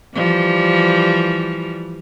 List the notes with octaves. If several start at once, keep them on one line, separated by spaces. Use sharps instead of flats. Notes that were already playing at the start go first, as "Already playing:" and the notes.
E3 F3 G3